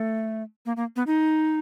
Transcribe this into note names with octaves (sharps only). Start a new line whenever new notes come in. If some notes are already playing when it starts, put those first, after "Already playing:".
Already playing: A3
A#3
A#3
B3
D#4